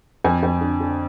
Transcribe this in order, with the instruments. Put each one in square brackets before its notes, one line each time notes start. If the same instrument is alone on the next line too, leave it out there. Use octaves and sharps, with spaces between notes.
[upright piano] F2 G#5
F2
D3
D3